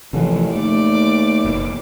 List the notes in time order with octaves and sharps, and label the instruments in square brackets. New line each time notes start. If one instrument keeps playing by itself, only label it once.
[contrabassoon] A1 [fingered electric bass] C3 E3 F3
[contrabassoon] D#2 [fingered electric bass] A3 [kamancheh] D5 D6
[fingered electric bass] F#1 B2